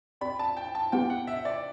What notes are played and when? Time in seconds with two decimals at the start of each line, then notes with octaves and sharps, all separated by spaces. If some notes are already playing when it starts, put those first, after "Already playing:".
0.21 C4 G4 D5 G5 B5
0.39 A5
0.57 G5
0.75 A5
0.92 B3 E4 G4 G5
1.10 F#5
1.27 E5
1.45 D5